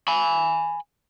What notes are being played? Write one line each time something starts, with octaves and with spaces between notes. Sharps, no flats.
G#5 B5